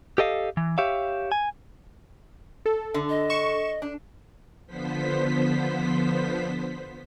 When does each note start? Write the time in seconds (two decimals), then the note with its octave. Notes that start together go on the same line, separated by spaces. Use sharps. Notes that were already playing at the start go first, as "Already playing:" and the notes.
0.18 G4 A4 D#5 F5
0.57 E3
0.78 G4 C#5 E5 F5
1.32 G#5
2.66 A4
2.94 D3
3.09 D#5
3.30 C#6 E7
3.82 D4
4.66 D3 F3 B3 C5 B6